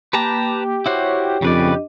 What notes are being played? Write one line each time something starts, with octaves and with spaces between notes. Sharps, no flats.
A#3 G4 B4 A5 A#5
E4 F#4 C5 C#5 C#6
F2 C#3 D4 B4 D5 D#5